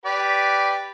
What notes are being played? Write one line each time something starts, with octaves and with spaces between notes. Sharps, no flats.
G4 B4 D5